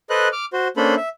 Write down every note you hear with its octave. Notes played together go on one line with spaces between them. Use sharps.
A4 B4 C5 D#5 F#6
D6 F6
F#4 C5
A#3 C#4 D4 A4 C5 B5
E5